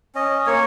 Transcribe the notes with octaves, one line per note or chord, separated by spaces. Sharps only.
C#4 D#5
A#3 C#5